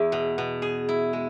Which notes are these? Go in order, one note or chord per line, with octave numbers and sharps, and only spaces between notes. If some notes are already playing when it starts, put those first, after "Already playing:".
Already playing: E2 E4
B2
B2
G#4
E4
G#3